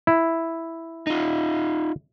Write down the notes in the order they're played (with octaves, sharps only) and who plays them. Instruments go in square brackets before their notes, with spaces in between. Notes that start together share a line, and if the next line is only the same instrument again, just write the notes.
[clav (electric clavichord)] E4
[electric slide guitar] D#4 F4